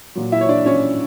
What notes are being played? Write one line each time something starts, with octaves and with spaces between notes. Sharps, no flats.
A#2 F#3
E4 E5
C#5
D4 D5
C#4 C#5